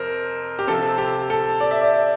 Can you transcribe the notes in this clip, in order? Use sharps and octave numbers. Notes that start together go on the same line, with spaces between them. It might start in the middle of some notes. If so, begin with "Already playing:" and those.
Already playing: F2 C3 A#4 C5
G4
C3 F3 C4 A4
G4
A4
D5
E5
D5